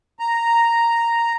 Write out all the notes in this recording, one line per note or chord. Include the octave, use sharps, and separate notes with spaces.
A#5